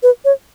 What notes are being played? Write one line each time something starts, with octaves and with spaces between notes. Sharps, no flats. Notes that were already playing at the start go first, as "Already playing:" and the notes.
B4
C#5